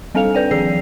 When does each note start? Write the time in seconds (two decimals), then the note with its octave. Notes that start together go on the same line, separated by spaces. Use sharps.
0.14 G3 C4 D4 A4 F5 F7
0.35 B4 D5 G5
0.51 D#3 F3 G#4 D5 C7